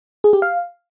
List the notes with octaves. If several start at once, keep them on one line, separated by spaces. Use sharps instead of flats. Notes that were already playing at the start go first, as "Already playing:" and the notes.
G#4
G4
F5